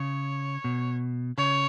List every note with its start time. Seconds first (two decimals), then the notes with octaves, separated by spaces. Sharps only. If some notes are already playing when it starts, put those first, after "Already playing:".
Already playing: C#3 C#5
0.64 B2
1.38 C#3 C#5